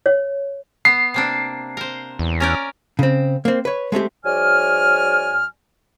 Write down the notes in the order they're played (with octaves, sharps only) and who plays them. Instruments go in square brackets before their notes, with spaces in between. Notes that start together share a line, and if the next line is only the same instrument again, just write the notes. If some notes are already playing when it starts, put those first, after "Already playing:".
[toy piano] C#5
[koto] B3 [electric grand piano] C7
[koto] C3 A#3 D4
A#4 C5
[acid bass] E2
[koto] C#4 A#4 D5
[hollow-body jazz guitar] C#3 C4
A#3 C4
B4 C#5
G#3 A3 C4 G4
[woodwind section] G#2 F#3 D5 G#5 F6